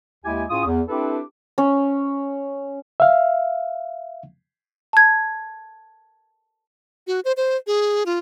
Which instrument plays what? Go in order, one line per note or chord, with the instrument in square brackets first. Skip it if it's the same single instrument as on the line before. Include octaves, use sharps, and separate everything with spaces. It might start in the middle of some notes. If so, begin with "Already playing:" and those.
[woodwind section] D#2 G#3 E4 G4 G#5
A2 C#4 F4 G#4 D#6
E2
C4 D4 E4 G4 A4 B4
[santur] C#4
[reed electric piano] E5 F5
[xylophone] A5 G#6
[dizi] F#4
C5
C5
G#4
F4